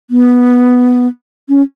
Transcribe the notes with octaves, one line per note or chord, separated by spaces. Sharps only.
B3
C#4